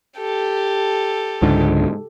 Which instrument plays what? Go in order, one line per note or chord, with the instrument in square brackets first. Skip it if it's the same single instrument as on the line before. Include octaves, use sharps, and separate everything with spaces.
[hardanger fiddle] G4 A4
[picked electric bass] C#2 G#2 D3